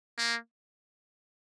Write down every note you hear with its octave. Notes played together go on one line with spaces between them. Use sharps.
A#3